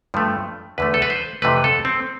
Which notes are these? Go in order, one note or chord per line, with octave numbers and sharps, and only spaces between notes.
G2 F3 A3
E2 D3 A3 B4
A4
B4
C5
F2 C3 E3 A3 B4
A4
C4